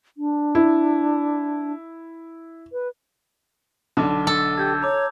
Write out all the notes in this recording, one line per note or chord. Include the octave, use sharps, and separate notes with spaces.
D4
E4
B4
B1 D3 A5 D6
A4
G4 E6 G6 G#6
C#5 A#5 D6